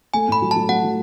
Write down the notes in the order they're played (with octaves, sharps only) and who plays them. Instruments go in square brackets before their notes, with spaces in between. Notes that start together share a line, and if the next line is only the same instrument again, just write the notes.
[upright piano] A3 [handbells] G#5
[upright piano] A2 [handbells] B5
[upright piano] F#3
[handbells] A5
[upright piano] F#3
[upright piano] F#3 [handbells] F#5
[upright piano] F#3